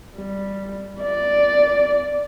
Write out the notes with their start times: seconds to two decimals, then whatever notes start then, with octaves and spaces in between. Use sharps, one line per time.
0.16 G3
1.01 D5